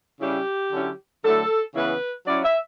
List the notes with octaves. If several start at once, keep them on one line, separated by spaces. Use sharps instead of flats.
C#3 G3 C#4 E4 G4
D3 F#3 C#4 E4
D3 F#3 A3 E4 A4
C#3 E3 B3 E4 B4
F#3 C#4 E4 D5
E5